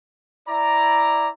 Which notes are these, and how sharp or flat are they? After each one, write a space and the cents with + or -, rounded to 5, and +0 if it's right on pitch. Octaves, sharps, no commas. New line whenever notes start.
E4 +0 D5 +0 A#5 +0